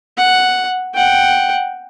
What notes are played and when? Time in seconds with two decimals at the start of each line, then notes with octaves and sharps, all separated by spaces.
0.18 F#5
0.94 F#5 G5